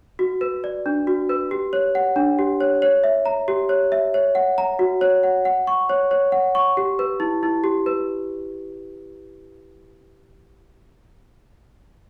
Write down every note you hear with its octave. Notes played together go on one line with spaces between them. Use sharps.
F#4
B4
D5
D4
F#4
B4
G4
C#5
F#5
D4
G4
C#5
C#5
E5
A#5
G4
C#5
E5
C#5
F#5
A#5
F#4
C#5
F#5
F#5
C#6
C#5
C#5
F#5
C#6
G4
B4
E4
E4
G4
B4